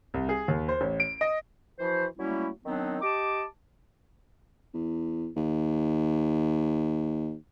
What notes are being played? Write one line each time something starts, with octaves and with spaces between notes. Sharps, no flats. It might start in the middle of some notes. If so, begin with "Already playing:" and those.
C2
G#4
D#2
C5
A1
D7
D#5
E3 F3 E4 F#4 C5
F#3 G3 A3 A#3 C#4 E4
D#3 F#3 B3 C4 D4 D#4
G4 D#5 A5 D6
E2
D#2